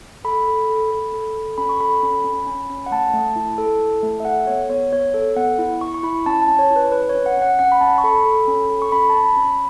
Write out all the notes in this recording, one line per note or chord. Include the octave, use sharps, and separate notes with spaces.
A4 B5
A4
A4
A4
A4
A4
C#4 B5
C#6
A4 B5
C#4
C#4
C#4
C#4
F#5
A3 A5
A3
E4
A4
E4
A3
E5
A4 F#5
B3 C#5
B3 C#5
B3 C#5
A4
B3 F#5
E4
E4 C#6
C#6
E4 B5
C#4 A5
A5
C#4
C#5
E4
B4
C#4 B4
C#5
C#4
F#5
C#4
F#5
C#4 F#5
B5
C#4 A5
C#6
A4 B5
A4
C#4
A4
C#6
C#4 B5
C#4 A5
B5
C#4
B5